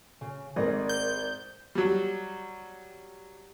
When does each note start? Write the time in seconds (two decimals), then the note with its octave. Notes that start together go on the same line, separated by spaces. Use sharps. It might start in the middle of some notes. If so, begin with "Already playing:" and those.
0.21 C#3
0.56 G#1 G#4 A#4 D5 D#5
0.89 G6
1.75 F#3 G3